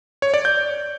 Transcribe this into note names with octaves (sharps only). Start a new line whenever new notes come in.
C#5
D5
G6